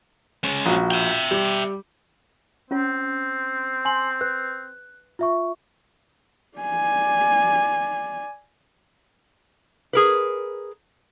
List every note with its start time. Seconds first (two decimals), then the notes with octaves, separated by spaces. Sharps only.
0.44 G#3 C#4
0.66 A#1 F#4
0.91 E5 G5
1.31 G3 G4
2.71 C4 C#4 F4 C#5
3.85 G#5 C6 F#7
4.21 B4 F#6
5.19 F4 E5 C#6
6.58 D5 G#5
9.93 G#4 A#4 B4